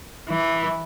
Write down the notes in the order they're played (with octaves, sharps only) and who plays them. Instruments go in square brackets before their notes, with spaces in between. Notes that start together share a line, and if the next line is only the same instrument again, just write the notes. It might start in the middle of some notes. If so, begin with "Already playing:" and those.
[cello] E3